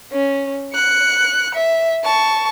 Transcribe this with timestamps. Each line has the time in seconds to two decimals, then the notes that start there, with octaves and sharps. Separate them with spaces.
0.12 C#4
0.73 F#6 C#7
1.55 E5
2.04 A5 C#6